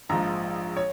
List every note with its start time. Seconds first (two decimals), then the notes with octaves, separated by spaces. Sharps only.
0.09 A#1 G#2 F3 A#5
0.77 C#5